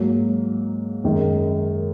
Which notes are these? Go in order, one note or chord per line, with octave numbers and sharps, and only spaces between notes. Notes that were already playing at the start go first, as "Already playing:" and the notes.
Already playing: G#2 F#3 A#3
F#2 D#3 G#3